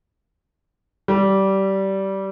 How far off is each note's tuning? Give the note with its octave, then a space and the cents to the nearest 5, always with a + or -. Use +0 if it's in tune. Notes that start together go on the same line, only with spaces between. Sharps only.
G3 -20